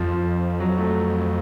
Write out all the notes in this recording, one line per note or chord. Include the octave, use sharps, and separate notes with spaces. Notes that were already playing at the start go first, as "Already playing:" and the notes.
Already playing: F2 F3
F#3
A3